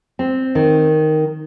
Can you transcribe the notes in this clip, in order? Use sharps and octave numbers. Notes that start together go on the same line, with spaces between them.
C4
D#3